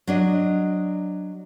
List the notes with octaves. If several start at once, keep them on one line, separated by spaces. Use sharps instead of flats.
F#3 D4 D#5